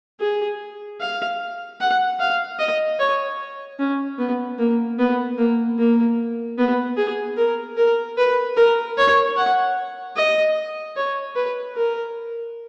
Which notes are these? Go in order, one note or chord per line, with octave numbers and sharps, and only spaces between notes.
G#4
F5
F#5
F5
D#5
C#5
C#4
B3
A#3
B3
A#3
A#3
B3
G#4
A#4
A#4
B4
A#4
C#5
F#5
D#5
C#5
B4
A#4